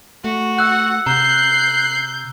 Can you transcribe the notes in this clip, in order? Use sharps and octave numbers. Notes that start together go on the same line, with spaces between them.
A3 F#4
F#5 E6 F#6
C3 A#5 F#6 G6 C7